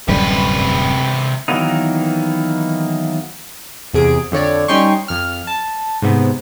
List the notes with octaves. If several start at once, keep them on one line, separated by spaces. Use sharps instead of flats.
D1 F#2 C3 G3 B4
D#3 E3 F#3 A#3 B3 D#4
E2 C3 G#4 D7
F2 D3 C#5 D5
G3 C#4 D#4 G5 C6 C#6
F2 F6
A5
G#2 C3 B3